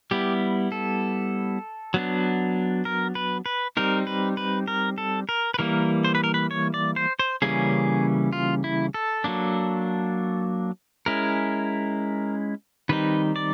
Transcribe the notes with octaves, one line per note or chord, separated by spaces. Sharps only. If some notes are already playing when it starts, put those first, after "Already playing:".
G3 B3 E4 G4
A4
F#3 B3 D4
A#4
B4
B4
G3 C4 D#4 A#4
B4
B4
A#4
A4
A#4
B4
E3 G3 A#3 A#4
C5
B4
A#4
B4
C#5
D5
C5
C5
C#3 E3 G3 A#3 C#4 G#4
F4
E4
A4
F#3 A#3 D4
G#3 C#4 E4 A#4
D#3 G3 C4 D#4 B4
D5